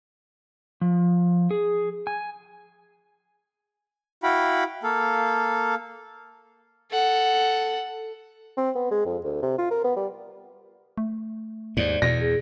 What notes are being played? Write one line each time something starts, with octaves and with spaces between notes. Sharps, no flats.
F3
G#4
G#5
E4 F#4 F5 G5 B5
A#3 A4 F5
A4 F#5
C4
B3
G#3
F2
D2
C3
F4
A#4
B3
G3
A3
D#2 G#2 D5
E2 B2 A#6
G#4